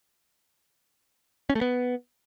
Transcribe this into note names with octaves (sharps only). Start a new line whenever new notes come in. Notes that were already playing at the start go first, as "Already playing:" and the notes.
C#4
A3
B3